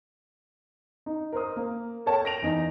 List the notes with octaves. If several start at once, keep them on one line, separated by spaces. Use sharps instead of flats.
D#4
A#4 C5 D#6
A#3
A4 A#4 C#5 G5 A5
A#6 D7 F7
E2 D#4 A#6